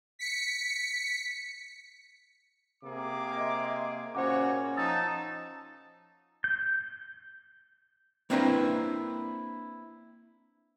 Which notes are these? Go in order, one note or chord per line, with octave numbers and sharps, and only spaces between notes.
B6 C#7
C3 A#3 G#4 D6
D#5 E5 C6
A#2 C#3 C#4 F#4 C5 C#5 F#5 D6
F3 D#4 A5 D#6 E6 A6
G6
A#3 C4 D4 E4 A#4 B4